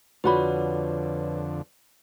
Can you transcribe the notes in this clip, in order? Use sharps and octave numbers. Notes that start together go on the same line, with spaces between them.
F2 D3 F4 F#4 B4 C#5 D5 B5